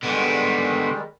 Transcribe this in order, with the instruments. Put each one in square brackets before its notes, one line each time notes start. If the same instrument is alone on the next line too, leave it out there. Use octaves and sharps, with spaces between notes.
[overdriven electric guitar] D3 B3 [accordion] D#3 G3 G#3